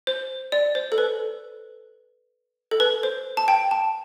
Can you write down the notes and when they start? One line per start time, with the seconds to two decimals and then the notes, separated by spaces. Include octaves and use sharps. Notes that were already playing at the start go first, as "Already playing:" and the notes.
0.07 C5
0.52 D5
0.75 C5
0.92 A4
0.98 B4
2.71 A4
2.80 B4
3.03 C5
3.37 A5
3.48 G5
3.71 A5